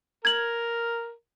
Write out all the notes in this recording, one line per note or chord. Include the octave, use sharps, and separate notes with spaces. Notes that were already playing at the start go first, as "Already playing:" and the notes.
A#4 G#6 F#7